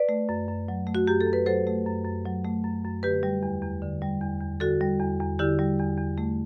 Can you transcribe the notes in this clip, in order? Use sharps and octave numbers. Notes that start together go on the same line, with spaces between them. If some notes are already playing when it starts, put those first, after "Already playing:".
Already playing: B4 D5
A3
F#2
F#2
F#3
A3
F#4
F#2 G4
A4
F#2
B4
F#3 A4 C5
A3
F#2
F#2
F#3
A3
F#2
F#2
D3 G4 B4
G3
E2
E2
D3
G3
E2
E2
D3 F#4 A4
G3
E2
E2
D3 E4 G4
G3
E2
E2
A3